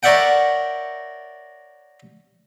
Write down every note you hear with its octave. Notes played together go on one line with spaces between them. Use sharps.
A#4 C#5 D5 E5 F#5 G5